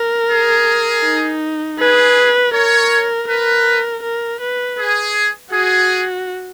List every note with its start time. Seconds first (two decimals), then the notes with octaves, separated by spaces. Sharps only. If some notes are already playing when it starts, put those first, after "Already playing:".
Already playing: A#4
0.30 G#4
1.04 D#4
1.79 G#4 B4
2.53 A#4 C#5
3.28 A#4 B4
4.03 A#4
4.41 B4
4.78 G#4
5.52 F#4 G#4